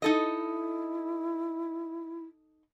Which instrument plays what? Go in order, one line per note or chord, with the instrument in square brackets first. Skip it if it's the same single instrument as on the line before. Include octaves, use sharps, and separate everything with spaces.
[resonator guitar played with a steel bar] D#4 A4 D#5 [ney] E4